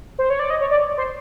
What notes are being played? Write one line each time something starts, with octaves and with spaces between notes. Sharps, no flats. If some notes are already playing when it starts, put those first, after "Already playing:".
C5
C#5
D5
D#5
C#5
D5
C5